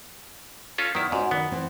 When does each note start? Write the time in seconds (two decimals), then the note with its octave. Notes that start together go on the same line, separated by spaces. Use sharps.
0.78 C#4 F4 A4
0.95 D#3 B3 E4 D5
1.12 G#2 C#4 F#4 D5
1.31 D#3 B3 F#4
1.52 E3 C4 E4